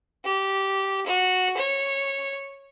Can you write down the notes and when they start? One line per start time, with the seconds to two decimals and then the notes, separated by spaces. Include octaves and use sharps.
0.25 G4
1.06 F#4
1.57 C#5